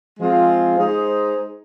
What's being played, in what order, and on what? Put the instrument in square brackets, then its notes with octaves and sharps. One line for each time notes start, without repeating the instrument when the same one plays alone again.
[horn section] F3 G#3 C4 F4 G#4
G#3 D#4 G#4 C5